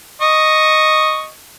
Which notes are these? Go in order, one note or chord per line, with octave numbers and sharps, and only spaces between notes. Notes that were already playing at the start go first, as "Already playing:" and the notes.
D#5 C#6